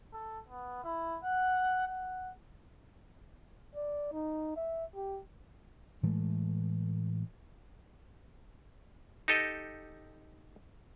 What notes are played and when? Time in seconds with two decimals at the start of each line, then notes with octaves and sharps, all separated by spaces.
0.14 A4
0.48 B3
0.84 E4
1.23 F#5
1.87 F#5
3.76 D5
4.13 D#4
4.57 E5
4.95 G4
6.03 A2 E3 G#3 A3
9.28 D#4 G4 A4 D#5